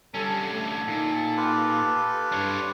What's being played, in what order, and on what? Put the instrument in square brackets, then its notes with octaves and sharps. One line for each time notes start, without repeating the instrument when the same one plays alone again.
[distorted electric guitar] D3 C#4 [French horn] G3 [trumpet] A4
[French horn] A3 [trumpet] A4
[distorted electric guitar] A#2 [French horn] D#4
[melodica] F4 G4 B4
[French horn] G2 [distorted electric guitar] D4 C#5